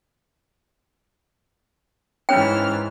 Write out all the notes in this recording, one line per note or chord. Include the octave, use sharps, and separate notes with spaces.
G#2 E3 C#4 C#5 G5 F6